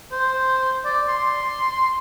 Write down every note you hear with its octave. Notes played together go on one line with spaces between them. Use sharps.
C5
D5
C6